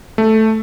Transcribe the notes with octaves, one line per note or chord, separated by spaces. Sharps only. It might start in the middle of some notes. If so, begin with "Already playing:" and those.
A3